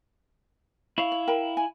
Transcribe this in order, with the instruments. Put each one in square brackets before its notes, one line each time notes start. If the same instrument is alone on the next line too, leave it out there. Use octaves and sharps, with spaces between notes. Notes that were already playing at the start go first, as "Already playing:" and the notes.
[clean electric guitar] E4 F5 [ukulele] C#5
[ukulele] C#5
A#4 G5 B5
G#5